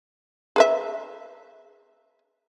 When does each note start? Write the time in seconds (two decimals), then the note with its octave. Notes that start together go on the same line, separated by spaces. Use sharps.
0.56 G#4 B4 E5